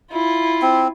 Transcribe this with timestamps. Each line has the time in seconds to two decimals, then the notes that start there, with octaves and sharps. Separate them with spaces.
0.11 E4 F4
0.62 C4